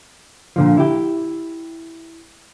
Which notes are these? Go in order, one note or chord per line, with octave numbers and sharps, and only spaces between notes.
A#2 D3 F3
E4 G4